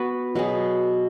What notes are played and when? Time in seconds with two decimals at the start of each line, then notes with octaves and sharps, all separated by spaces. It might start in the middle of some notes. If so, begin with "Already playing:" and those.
Already playing: B3 F#4 B4
0.35 B2 F#3 B3 G#4